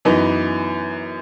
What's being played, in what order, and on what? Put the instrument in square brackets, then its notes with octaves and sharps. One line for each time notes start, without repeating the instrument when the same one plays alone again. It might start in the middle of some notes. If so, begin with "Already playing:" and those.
[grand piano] F#2 E3 B3 D#4